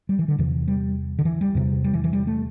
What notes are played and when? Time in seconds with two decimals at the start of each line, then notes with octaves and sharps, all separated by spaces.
0.09 G3
0.19 E3
0.28 D3
0.38 E2 C3 E3
0.68 G3
1.19 D3
1.25 E3
1.41 G3
1.55 E2 C3
1.84 G3
1.93 E3
2.04 E3
2.13 G3
2.27 A3